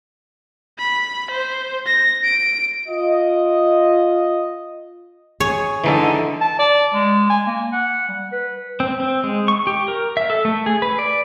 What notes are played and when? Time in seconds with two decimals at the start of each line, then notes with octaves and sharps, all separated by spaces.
0.78 B5
1.31 C5
1.86 A#6
2.24 D7
2.88 F4 D#5
5.40 G#4 C#5
5.84 D3 E3 D#4 A4
6.41 A5
6.59 D5
6.94 G#3
7.30 G#5
7.47 A#3
7.73 F#5
8.08 G3
8.32 B4
8.80 C4
9.00 C4
9.24 G#3
9.48 C#6
9.67 G4
9.88 A#4
10.17 E5
10.30 A4
10.45 A3
10.66 G#4
10.82 B4
10.99 D5